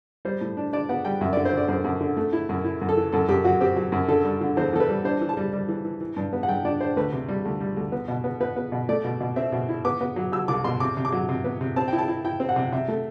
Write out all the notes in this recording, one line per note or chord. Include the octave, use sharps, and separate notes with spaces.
G3 C5
A2
D4
D4 D5
B3 F#5
G3 G5
F#2 E5
D3 D5
C5
D3 D5
F#2 C5
F#2
D3
A3
E4
F#2
E4
F#2
A4
E3
F#2 A4
F#2 G4
F#3 F#4
C4 G4
F#3
F#2
D3 A4
G3
D3
E2 C5
E2 A4
B4
G3
D4 C5
E3
A5
G3
G3
E3
E3
E3
G2
B3
F#5
G2 G5
D4 D5
D4 C5
D2 B4
C3
G3
D2
G3
D2
B3
B2
B3
B3 B4
B3
B2
A3 D5
B2
B2
C4 E5
B2
E4
B3 D6
B3
F#3
F#3 E6
C2 D6
B2 C6
C3 D6
C3
D6
F#3
C3
B3
C3
C4 A5
E4 G5
A5
E4
E4 G5
C4
F#5
C3
C3 E5
A3